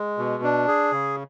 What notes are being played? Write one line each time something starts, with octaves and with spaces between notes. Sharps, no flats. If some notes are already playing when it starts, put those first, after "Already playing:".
Already playing: G#3
B2
D4
G#4
C#3